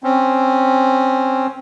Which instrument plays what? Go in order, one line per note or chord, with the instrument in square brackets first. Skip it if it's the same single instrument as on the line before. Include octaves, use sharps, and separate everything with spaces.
[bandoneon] C4 C#4